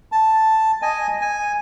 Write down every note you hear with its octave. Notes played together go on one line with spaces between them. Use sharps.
A5
D#5 G#5
G#5